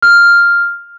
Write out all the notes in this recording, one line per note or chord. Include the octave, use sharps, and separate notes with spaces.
F6